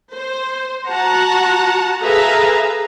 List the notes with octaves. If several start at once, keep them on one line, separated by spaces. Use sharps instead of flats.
C5
F#4 F#5 A5 A#5
G#4 A4 B4 E5 F5 A#5